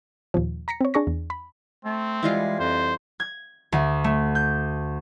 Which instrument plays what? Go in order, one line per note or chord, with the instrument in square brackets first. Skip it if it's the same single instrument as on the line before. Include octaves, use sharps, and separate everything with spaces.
[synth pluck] D#2 A#2 F3
A#5 A#6 B6 C#7
C4 C#5
D4 G#4 C#6 A#6
E2
B5
[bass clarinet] A3 [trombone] C4
[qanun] E3 G3 F4 [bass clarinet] G#3
[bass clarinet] F2 [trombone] C5
[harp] G#6
D2
A3
G6